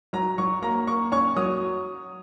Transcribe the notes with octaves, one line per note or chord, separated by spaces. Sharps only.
F#3 A#5
F#3 C#6
A#3 A#5
A#3 C#6
C#4 C#6
F#3 D#6